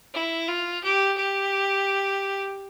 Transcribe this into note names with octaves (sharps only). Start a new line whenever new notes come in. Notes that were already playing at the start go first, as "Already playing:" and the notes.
E4
F4
G4
G4